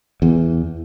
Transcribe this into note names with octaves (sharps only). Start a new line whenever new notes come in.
E2